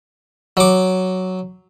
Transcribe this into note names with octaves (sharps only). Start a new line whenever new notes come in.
F#3 D6